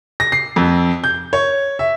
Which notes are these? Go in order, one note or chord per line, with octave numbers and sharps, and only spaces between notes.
A#6
C7
F2
G6
C#5
E5